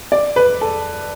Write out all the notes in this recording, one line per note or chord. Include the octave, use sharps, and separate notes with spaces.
D5
B4
A4